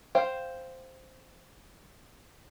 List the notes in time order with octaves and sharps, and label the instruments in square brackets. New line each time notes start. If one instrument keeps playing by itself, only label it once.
[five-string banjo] C5 F5 G5